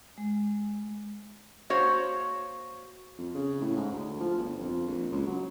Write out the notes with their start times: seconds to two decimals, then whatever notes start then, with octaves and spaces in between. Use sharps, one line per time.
0.18 G#3
1.70 A#3 F#4 C5 C#5
3.18 F2
3.35 C#3
3.61 A2
3.76 G#2
3.92 D2
4.20 F3
4.37 G1
4.60 F2
4.88 A#1
5.11 C#2
5.27 F#3